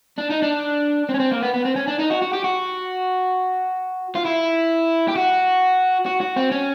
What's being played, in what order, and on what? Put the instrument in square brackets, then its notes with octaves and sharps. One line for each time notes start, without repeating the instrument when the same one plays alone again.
[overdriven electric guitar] D4
D#4
D4
C4
C#4
C4
A#3
B3
B3
C4
C#4
D4
D#4
F#4
F#4
G4
F#4
F4
E4
G4
F#4
F#4
F#4
C4
C#4